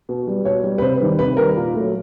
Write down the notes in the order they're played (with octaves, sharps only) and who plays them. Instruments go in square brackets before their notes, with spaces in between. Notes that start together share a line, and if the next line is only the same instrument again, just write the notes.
[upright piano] B2
G3
B2 C#5
G3
B4
C3 C5
D#3 G3
C3 B4
D#3 G3 A#4
A#2
F#3 A3